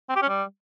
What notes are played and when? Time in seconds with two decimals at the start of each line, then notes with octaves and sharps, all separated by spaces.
0.09 C4
0.16 G4
0.22 C#4
0.29 G3